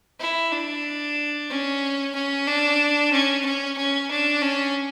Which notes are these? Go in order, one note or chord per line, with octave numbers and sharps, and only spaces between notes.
E4
D4
C#4
C#4
D4
C#4
C#4
C#4
D4
C#4